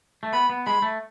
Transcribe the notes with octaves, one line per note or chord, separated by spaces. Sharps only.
A3
B3 B5
B3
G#3 B5
A3